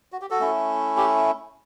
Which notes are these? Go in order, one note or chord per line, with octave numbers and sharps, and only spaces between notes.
F#4
G4
F#4 A4
A3 C#4 E4
G4